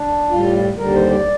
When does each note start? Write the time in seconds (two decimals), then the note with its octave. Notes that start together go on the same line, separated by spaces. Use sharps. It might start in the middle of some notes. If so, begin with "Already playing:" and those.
Already playing: D4
0.30 A2 G3 F4
0.78 D#2 D3 G3 A#4
0.94 C5
1.10 D5